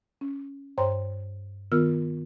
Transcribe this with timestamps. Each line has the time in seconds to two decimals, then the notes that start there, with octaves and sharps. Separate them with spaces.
0.21 C#4
0.78 G2 C5 C#5 G5 A#5 C6
1.72 D#3 B3 F4 A#4 E6 F6